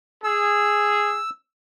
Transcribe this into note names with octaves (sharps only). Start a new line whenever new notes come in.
G#4 E6